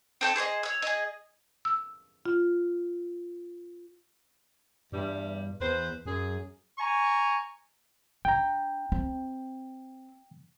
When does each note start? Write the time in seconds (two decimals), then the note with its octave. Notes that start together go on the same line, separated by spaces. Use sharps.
0.21 C4 A4 G5
0.36 G#4 C5 C#5 D#5
0.63 C#5 E6
0.82 G#4 D#5
1.65 E6
2.26 F4
4.92 E2 G2 G3
5.60 E2 B4 C5
6.06 F#2 G#4
6.79 G#5 A#5 C#6
8.25 D4 G5 A#5
8.92 C4